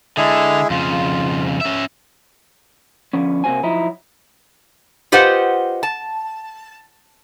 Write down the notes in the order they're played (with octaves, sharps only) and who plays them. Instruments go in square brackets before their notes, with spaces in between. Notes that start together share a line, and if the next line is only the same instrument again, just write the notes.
[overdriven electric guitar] D3 [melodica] G#3 E4 G#4
[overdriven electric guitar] F2 C#3 [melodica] F4
[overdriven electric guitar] C#4 E5
[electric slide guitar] D3 F3 B3 C#4
C3 A#3 C4 F#4 C5 G#5
F3 F#3 D#4 E4
[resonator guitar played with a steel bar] F4 G4 B4 C5 D#5 F#5
A5